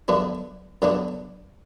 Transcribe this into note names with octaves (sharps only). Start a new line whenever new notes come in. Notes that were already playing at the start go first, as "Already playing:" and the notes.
F#2 D3 F#3 B3 D4
F#2 D3 F#3 B3 D4